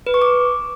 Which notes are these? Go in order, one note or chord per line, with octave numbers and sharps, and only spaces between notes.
B4
C#6
D6